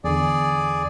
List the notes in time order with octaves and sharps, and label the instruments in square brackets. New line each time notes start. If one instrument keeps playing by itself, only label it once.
[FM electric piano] E2 D3 [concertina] G#4 D5